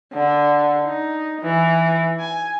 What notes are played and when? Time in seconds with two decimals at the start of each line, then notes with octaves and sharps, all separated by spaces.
0.14 D3
0.85 D#4
1.42 E3
2.20 G#5